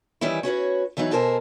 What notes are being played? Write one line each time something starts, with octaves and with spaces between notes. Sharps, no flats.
D#3 E3 G3 C#4 E4
C#4 F#4 B4 C#5
E2 E3 F#3 D#4 B4
B2 A4 A#4 C5 G#5